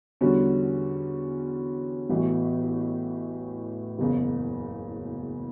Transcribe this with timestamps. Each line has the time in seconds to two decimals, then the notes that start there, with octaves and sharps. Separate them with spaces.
0.21 E2 D3 G3 C#4 F#4
2.09 A1 A2 E3 B3 F#4
3.98 F#1 E2 C#3